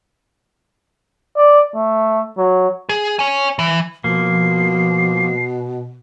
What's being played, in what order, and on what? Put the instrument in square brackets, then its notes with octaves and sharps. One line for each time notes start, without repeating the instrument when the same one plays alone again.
[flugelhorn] D5
A3
F#3
[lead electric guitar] G#4
C#5 G#5
E3
[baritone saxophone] B2 [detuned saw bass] F3 [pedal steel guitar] A#3 [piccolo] C7